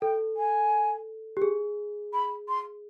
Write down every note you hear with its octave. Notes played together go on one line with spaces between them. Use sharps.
A4 G5
G#5
G4
G#4
B5
C6